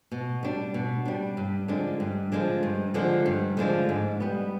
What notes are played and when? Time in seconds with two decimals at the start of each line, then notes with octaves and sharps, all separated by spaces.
0.11 B2
0.43 G3 D4
0.74 B2
1.05 G3 D4
1.37 G2
1.68 D3 F3 G#3 D4
2.00 G2
2.32 D3 F3 G#3 D4
2.63 G2
2.94 D3 F3 G#3 D4
3.26 G2
3.57 D3 F3 G#3 D4
3.89 G#2
4.20 G3 B3